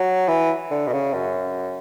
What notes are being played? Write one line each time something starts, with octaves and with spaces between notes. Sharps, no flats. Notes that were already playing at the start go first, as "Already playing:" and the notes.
Already playing: F#3
E3
D3
B2
C#3
F#2